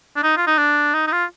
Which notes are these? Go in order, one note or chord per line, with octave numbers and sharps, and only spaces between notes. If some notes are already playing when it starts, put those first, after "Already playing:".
D4
D#4
F4
D#4
D4
D#4
D#4
F4